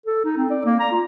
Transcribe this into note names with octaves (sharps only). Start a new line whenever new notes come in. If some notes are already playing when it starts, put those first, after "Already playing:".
A4
D#4
C4
D5
A#3
A#5
F4